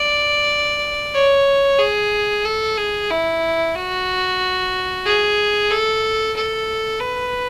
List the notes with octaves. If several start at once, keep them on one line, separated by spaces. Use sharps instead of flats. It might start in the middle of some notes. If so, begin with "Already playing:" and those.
Already playing: D5
C#5
G#4
A4
G#4
E4
F#4
G#4
A4
A4
B4